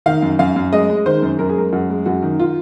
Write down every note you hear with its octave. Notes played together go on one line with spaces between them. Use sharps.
D#3 F5
F#2
F#2 F5
F#2
G#3 D#5
G#3
D#3 C5
F#2
F#2 A#4
G#4
G#3 A#4
F#2 F#4
G#3
F#2 F#4
D#3
F4